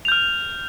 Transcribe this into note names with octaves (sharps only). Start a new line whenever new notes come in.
F6 G6 F7